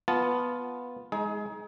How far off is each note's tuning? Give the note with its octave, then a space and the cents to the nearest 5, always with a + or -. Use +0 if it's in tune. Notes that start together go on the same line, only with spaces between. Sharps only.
B3 +0 F4 +5 A5 -20
G#3 +0 D#4 +30 G#4 +30